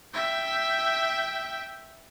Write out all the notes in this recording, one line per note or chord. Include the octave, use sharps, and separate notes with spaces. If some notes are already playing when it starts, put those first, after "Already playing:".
E5 G5